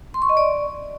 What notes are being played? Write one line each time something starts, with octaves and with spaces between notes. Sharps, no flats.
C6
C#6
D#5
D5